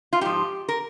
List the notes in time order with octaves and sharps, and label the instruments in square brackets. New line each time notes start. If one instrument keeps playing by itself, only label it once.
[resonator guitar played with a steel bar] F4
G#2 F3 G4
A#4